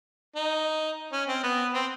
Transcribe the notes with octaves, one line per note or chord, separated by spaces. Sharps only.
D#4
C#4
C4
B3
C4